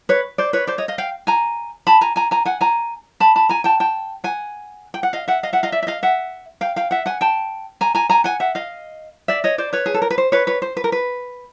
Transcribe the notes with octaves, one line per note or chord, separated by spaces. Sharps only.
B4 C#5
C5 D5
B4 C#5
C5 D5
C#5 D#5
D#5 F5
F5 G5
G#5 A#5
A5 B5
G#5 A#5
G#5 A#5
G#5 A#5
F#5 G#5
G#5 A#5
A5 B5
A5 B5
G#5 A#5
G5 A5
G5 A5
F#5 G#5
G5
F#5
D#5 F5
E5 F#5
D#5 F5
E5 F#5
D#5 F5
D5 E5
E5
D#5 F5
E5 F#5
F5 G5
F5 G5
E5 F#5
F#5 G#5
G5 A5
G#5 A#5
G#5 A#5
G#5 A#5
F#5 G#5
E5 F#5
D#5 F5
D5 E5
C#5 D#5
C5 D5
B4 C#5
G#4
A4
A#4
B4
C5
B4 C#5
B4 C#5
C5
B4
A#4
B4